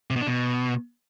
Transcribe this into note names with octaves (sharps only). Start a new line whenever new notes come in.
C3
B2
D4
B2